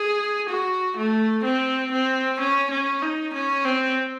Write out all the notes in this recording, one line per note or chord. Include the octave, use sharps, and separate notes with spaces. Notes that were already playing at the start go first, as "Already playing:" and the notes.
Already playing: G#4
F#4
A3
C4
C4
C#4
C#4
D#4
C#4
C4